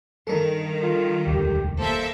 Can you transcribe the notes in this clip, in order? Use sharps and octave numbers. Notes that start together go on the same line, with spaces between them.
G2 D#3 A4 A#4
F4
E1 D2 G4
A#3 A4 C5 E5